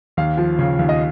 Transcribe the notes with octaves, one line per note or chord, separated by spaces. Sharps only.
D#2 F5
F3
C#3
D#2
D#5